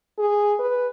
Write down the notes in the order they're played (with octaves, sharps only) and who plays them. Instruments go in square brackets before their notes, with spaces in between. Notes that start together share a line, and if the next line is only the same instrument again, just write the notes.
[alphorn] G#4
B4